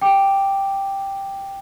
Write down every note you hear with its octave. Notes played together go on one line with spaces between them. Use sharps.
G5 D6